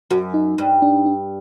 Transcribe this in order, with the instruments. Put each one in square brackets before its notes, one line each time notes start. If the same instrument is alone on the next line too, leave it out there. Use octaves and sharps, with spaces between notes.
[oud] F#2 [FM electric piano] F#4
[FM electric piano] D#4
[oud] G2
[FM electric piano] D4
D4